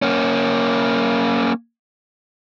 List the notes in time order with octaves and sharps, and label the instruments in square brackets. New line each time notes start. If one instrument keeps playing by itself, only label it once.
[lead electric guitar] A#3 C#4